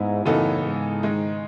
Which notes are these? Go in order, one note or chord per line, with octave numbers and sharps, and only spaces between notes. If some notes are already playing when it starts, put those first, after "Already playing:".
Already playing: G#2 B3 E4
F#2 A2 C#3 E3 B3 D#4 A4
G#2
D#3 G#3 D#4